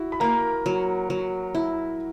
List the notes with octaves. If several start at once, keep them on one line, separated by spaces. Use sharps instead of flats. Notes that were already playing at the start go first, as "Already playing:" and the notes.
Already playing: E4 F#4
B5
A#3 A#4 A#5
F#3
F#3
E4